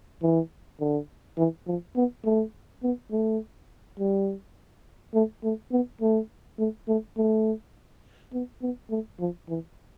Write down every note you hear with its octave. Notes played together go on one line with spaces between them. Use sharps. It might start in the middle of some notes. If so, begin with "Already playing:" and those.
E3
D3
E3
F3
B3
A3
B3
A3
G3
A3
A3
B3
A3
A3
A3
A3
B3
B3
A3
F3
E3